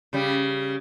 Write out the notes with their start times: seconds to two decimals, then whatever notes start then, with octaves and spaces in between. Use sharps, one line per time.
0.13 C#3 G3